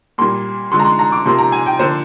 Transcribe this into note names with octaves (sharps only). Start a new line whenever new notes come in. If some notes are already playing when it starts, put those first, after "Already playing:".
A#2 G3 A#3 C6
D3 F3 G#3 C6
A#5
C6
A#5
D6
C3 F3 A#3 C6
A#5
G#5
G5
D3 F3 A#3 C5